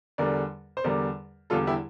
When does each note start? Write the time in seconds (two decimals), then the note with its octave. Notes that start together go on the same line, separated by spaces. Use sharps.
0.18 E2 D3 G3 A#4 D5
0.77 C5
0.84 E2 D3 G3 A#4 D5
1.50 E2 D3 G3 F4 A4
1.67 E4 G4